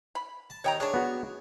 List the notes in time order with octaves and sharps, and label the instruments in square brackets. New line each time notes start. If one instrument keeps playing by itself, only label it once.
[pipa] B5
[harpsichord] A5
[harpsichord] D#2 D#5 [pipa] C#5 G5 A#5
[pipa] G#3 D4 [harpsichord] G#4 C#5
[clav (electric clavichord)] B3 F#4